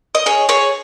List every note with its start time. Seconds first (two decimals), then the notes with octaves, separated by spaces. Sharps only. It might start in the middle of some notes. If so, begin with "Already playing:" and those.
0.15 D#5
0.26 G#4 C#5
0.49 G#4 C#5